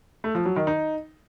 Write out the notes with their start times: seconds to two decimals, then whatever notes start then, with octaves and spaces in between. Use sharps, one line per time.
0.24 A3
0.35 F3
0.46 F#3
0.56 D#3
0.67 D#4